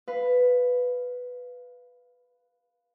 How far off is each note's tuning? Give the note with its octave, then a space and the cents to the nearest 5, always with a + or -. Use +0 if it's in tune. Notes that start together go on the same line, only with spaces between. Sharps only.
B4 +5 F5 +0